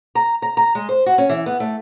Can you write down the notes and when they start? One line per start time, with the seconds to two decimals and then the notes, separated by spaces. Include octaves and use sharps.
0.15 A#5
0.42 A#5
0.57 A#5
0.75 G#3
0.89 C5
1.06 F#4
1.18 C#4
1.29 E3
1.46 B3
1.60 A3